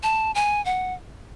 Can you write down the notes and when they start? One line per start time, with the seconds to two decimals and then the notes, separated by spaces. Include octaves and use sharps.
0.03 A5
0.35 G#5
0.65 F#5